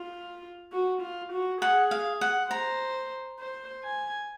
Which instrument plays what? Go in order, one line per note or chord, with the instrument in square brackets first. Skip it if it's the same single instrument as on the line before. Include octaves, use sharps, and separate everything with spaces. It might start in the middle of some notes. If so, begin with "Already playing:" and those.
Already playing: [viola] F4
F#4
F4
F#4
[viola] G#4 [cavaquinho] F#5
[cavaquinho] F5
F#5
[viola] C5 [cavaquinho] A#5
[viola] C5
G#5